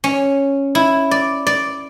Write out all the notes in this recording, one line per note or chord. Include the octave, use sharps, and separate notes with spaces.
C#4
E4
D5
D5